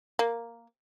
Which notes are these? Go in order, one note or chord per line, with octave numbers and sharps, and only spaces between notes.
A#3